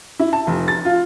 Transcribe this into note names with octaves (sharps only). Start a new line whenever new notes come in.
E4
A5
F1
A6
F4